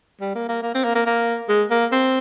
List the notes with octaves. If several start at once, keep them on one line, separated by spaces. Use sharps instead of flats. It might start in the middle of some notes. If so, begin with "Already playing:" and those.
G3
A#3
A#3
A#3
C4
A#3
A#3
A#3
G#3
A#3
C4